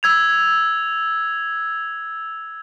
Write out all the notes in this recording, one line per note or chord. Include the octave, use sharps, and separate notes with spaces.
E6 G#6 F7